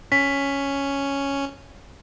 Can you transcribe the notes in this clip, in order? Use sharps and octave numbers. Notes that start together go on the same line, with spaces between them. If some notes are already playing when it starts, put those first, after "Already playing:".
C#4 B6